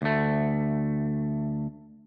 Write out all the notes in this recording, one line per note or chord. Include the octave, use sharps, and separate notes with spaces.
D2 A3